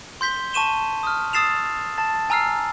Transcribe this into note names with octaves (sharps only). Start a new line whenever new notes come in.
C6 G6 B6 G7
A5 C#6 D#7 E7 G7
D#6 F6
D#6 E6 A6 C7 E7 F7
A5 A6
G#5 A#5 E6 F6 C7